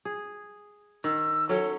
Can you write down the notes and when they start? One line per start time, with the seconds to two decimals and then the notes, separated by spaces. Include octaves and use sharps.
0.05 G#4
1.04 D#3 E6
1.49 F#3 C#4 A4